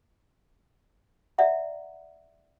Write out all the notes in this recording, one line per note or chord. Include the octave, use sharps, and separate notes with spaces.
D5 E5 F#5 A#5